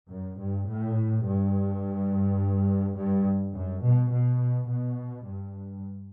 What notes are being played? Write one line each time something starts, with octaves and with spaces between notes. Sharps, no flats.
F#2
G2
A2
G2
G2
F#2
B2
B2
B2
G2